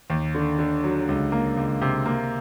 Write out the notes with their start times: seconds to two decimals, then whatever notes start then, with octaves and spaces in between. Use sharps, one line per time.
0.10 D#2
0.35 D3
0.59 D3
0.84 F#3
1.09 C#2
1.32 A#3
1.57 C#2
1.82 C3
2.06 A#3